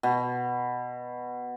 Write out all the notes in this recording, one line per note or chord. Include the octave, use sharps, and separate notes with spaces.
B2